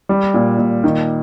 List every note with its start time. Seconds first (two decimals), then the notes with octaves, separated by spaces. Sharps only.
0.09 G3
0.34 A#2
0.58 A#2
0.84 D#3